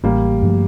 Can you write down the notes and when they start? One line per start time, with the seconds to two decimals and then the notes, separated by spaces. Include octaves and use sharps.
0.04 A1 G3 A#3
0.42 G2 F3 A3